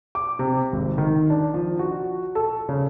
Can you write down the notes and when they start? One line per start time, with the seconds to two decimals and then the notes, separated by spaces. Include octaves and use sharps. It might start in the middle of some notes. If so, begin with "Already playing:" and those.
0.15 D6
0.39 C3
0.72 G#1
0.98 D#3
1.30 D4
1.54 F3
1.79 F#4
2.35 A4
2.69 C#3